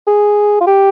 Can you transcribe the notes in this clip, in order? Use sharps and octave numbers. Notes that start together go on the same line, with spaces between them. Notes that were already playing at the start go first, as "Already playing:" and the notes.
G#4
F4
G4